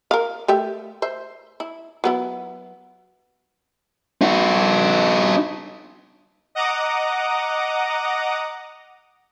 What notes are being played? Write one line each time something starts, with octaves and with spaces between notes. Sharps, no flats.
A#4 F5
A3 G4 E5
C5 E5
E4
F#3 B3 E4
D#4 F#4
D#5 F#5 A#5 D6 D#6